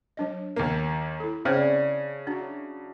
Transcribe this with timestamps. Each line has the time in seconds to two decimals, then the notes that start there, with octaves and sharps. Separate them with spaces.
0.17 F#3 D4 D#5
0.56 D#2 A#3
1.20 E4 A4
1.45 C#3 C4 D4 E4 C5 C#5
2.27 F#3 D4